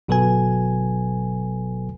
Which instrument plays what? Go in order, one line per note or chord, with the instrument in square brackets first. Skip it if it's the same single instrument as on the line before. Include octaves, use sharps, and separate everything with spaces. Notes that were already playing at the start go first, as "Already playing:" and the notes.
[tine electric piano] G1 B2 F#3 A4 B4 G#5